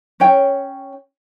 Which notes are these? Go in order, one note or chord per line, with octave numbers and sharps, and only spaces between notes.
C#4 C#5 G5